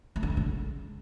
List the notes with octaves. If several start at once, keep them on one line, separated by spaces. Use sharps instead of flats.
A3
D3
G#3
C#3